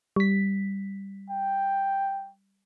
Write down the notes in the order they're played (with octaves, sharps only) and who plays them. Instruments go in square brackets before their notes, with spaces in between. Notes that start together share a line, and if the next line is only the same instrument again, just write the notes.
[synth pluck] G3 B6
[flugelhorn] G5